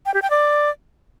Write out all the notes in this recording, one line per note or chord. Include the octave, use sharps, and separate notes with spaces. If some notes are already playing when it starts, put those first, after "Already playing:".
G5
G4
G5
D5